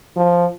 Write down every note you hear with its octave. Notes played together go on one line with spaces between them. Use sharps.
F3